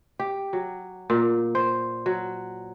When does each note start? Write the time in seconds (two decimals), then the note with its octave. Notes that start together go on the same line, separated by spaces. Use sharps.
0.19 G4
0.53 F#3
1.10 A#2
1.55 C5
2.06 F#3